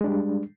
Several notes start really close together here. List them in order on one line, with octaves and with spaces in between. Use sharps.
G#3 D4 G3